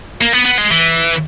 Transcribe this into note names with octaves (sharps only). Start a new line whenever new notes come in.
A#3
B3
B3
G#3
E3